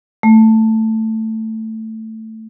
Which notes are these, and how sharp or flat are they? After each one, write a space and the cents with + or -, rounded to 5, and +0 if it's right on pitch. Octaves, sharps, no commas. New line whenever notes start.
A3 +10